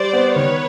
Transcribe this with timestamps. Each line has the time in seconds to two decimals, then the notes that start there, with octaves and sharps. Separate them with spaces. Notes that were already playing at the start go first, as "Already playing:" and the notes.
Already playing: G3 C5 D5
0.13 B3
0.36 D#3 B4 C#5